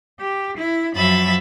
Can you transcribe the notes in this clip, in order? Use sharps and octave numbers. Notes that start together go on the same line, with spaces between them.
G4
E4
F#2 F3 F#3 E5 B5 A6